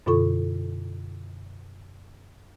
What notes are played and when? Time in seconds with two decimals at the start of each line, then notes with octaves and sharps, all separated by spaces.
0.06 F#2 B2 D3 F4 A4 C#6